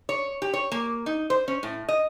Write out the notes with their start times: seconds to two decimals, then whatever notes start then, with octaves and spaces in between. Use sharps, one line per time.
0.09 C#5
0.42 G4
0.54 C#5
0.72 A#3
1.06 D#4
1.30 C5
1.48 C#4
1.63 A2
1.89 D#5